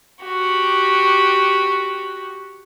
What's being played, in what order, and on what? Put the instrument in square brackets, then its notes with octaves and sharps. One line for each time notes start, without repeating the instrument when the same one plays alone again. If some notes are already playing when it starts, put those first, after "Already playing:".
[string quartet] F#4 G4